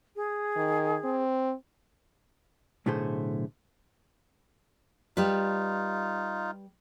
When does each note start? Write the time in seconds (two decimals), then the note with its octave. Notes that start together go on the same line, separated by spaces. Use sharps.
0.15 G#4
0.57 D#3
1.04 C4
2.86 B1 A2 D3 A3 G#4 C5
5.17 G3 D#4 F4 G4 B4